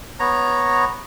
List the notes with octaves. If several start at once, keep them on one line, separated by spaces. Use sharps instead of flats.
B3 C#5 A#5